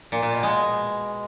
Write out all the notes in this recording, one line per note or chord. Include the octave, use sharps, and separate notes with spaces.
A#2
A#2
B2
G#3